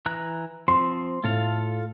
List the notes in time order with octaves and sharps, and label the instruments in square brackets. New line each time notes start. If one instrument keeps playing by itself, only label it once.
[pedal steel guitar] E3 A#5 F#6
[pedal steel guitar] F3 C4 [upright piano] C6
[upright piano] A2 [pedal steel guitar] F4 A4 F5